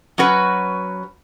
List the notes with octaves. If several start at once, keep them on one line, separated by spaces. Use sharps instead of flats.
F#3 C#4 F#4 B4